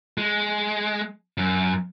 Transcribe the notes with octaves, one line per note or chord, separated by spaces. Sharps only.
G#3
F#2